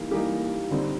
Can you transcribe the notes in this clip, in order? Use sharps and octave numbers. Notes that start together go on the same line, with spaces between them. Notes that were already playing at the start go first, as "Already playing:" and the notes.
Already playing: E3 G3 A#3 D#4
E3 G3 A#3 D#4 G4
D3 G3 C4 D#4